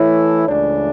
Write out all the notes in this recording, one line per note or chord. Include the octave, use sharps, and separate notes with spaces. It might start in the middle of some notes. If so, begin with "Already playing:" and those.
Already playing: E3 A3 E4 A4 C#5
C#2 C#3 E3 A3 D4 D5